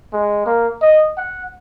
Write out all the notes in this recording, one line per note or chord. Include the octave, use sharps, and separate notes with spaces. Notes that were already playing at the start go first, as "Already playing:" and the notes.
G#3
A#3
D#5
F#5